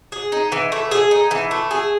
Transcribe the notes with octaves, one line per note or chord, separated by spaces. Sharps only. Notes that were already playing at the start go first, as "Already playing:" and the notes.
G#4
D#4
E3
A3
G#4
D#4
E3
A3
G#4